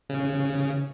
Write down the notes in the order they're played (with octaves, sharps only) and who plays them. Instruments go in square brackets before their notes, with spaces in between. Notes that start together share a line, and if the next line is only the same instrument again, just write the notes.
[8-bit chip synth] C#3